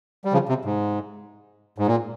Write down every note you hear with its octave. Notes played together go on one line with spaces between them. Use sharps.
G3
C#3 F3
C3
G#2
G#2
A#2